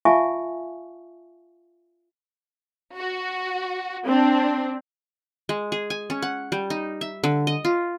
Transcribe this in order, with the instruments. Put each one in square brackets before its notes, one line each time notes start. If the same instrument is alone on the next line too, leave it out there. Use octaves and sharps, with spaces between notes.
[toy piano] F4 E5 F5 G#5 A5 C#6
[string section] F#4
C4 D4
[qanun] G#3
G#4
G#5
C#4
F#5
G3
D#4
E5
D3
D#5
F4